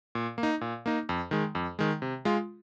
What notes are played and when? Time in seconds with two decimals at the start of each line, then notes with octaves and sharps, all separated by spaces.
0.15 A#2
0.38 A#3
0.43 D#4
0.61 A#2
0.86 A#3 D#4
1.09 F2
1.31 D#3 G#3
1.55 F2
1.79 D#3 G#3
2.02 C3
2.25 G#3 F4